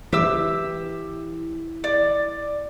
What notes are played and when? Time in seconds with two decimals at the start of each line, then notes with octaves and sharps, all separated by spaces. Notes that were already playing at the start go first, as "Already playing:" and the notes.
0.13 E3 G4 D6 E6
1.84 D5